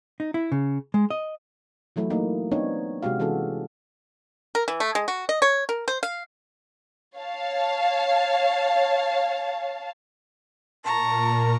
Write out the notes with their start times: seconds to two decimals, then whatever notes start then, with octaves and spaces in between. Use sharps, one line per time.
0.20 D#4
0.34 E4
0.52 C#3
0.94 G#3
1.11 D#5
1.96 E3 F#3 A3 E4
2.10 A3 A#3 D#4
2.51 B3 C4 D4 D#4 C#5
3.03 C3 G#3 F#4 G4 F5
3.20 E3 G#3 C#4 F#4 A4
4.55 A#4
4.68 E3
4.80 A3
4.95 G#3
5.08 F#4
5.29 D#5
5.42 C#5
5.69 A#4
5.88 C5
6.03 F5
7.16 C#5 F5 A5
10.85 A#2 A#3 A5 A#5 C#6